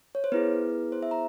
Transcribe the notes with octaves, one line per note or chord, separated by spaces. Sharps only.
C#5
C5
B3 E4 G#4 B4
C5
E5
A#5